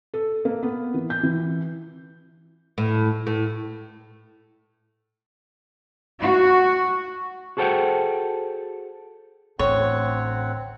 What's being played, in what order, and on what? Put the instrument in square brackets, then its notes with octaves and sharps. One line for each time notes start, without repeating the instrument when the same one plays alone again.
[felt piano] A4
A#3
B3
E3
G6
E3
[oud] A2
A2
[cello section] F#4
[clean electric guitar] F#4 G#4 A4 C5 F#5 G5
[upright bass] A1 [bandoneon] D2 C4 F#5 [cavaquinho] C#5